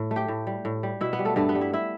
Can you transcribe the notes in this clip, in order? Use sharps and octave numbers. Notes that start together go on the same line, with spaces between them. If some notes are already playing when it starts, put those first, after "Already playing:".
Already playing: A2
A3
G4 G5
A2
G3
A2
G3
B2 E4 E5
B3 B4
G3
A3 A4
G2 A3 A4
B3 B4
G3
E4 E5
E4 E5